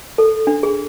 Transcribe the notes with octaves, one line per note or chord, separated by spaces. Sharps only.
A4
D4
G#4